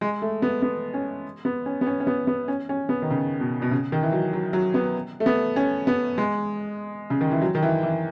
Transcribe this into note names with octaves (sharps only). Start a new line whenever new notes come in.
G#3
A3
B3
B3
C#4
B3
C#4
B3
C#4
C#4
B3
B3
C#4
C#4
B3
D#3
C#3
B2
B2
C#3
D#3
E3
F#3
F#3
F#3
B3
A3
B3
C#4
B3
G#3
C#3
D#3
E3
F#3
D#3
E3
E3